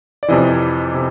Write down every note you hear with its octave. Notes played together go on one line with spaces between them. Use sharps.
D5
F2 C3 E3 D#5
C3